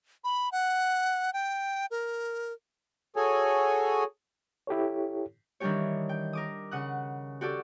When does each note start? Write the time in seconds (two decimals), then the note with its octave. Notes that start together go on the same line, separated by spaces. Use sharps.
0.24 B5
0.52 F#5
1.33 G5
1.91 A#4
3.16 F#4 G#4 A4 C#5 G#5
4.67 E4 G4 A4 C#5
5.60 D#3 E3 G3 D4 G4 C#5
6.09 G5
6.33 A#4 D6 D#6
6.71 C#3 F#5 D#6 F#6
7.41 F#4 G4 A4 D5